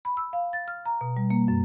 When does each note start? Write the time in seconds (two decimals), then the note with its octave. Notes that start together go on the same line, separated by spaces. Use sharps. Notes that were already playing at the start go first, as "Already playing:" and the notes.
0.05 B5
0.17 E6
0.33 F5
0.53 A6
0.68 F6
0.86 A#5
1.01 B2
1.17 G3
1.30 A#3
1.48 F#2